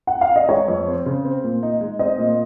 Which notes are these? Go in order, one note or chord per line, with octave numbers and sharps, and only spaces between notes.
F#5
F5
D#5
G#3 C#5
F2
C4
C#3
C4
A#2
D#4
G#3
C4 D#5
A#2